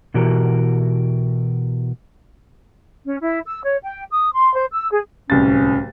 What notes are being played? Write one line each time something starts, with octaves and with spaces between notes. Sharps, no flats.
B2 E3 F#4 G4 A#4
C#4
E4
E6
C#5
G5
D#6
C6
C5
E6
G#4
D1 C2 C#4 A6